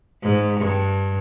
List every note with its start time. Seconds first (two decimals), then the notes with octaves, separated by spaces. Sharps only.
0.22 G#2
0.61 G2